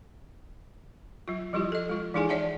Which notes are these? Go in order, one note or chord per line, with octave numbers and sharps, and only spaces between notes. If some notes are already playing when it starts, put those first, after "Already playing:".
F#3 F4
F3 G3 E4 F4 G4
A4 D#5
G#3 F4
E3 G#3 D#4 E4 G#4 G#5
C#5 D5 E5 F#5 A5